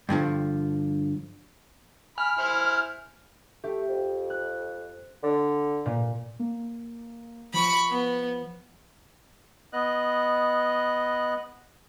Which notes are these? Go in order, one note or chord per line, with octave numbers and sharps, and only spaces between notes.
G2 D3 E3 F3
G#5 B5 F6
E4 C5
A3 G4
F2
F#6
D3
A#2
A#3
F3 B5 C#6
B3
B3 D#5 F#6